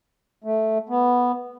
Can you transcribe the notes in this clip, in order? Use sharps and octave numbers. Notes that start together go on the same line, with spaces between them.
A3
B3